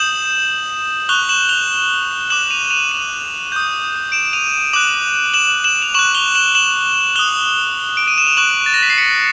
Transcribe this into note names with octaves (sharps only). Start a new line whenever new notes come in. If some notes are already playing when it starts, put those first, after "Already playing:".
Already playing: D#6 G6 E7 F#7
C#6 F#6 F7 G7
E7 F#7
F7 G7
D6 F#6 E7 F#7
D#7 F7
D#7 F7
D#7 F7
D#6 G6
D7 E7
D#7 F7
D6 F#6 E7 F#7
E7 F#7
E7 F#7
F7
C#6 F#6 E7 F#7
F7 G7
E7 F#7
E7 F#7
D#6 F#6 F7 G7
D7
D#7
E7
F7
C#6 F#6 E7 F#7
A6
A#6
B6
C7
B6 C#7